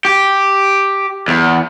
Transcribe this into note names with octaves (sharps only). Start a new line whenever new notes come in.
G4
E2